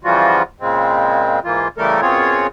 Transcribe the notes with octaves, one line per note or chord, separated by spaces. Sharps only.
C#3 E3 F3 G3 F4 F#4
A#2 C#3 G#3 C4
G#2 E3 A#3 F4
C#3 E3 G3 A3 A4 A#4
F#2 B2 C4 F4 G#4 C#5